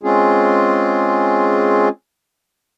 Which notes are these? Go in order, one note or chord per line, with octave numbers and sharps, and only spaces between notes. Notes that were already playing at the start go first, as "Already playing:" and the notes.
G#3 C4 C#4 F4 G#4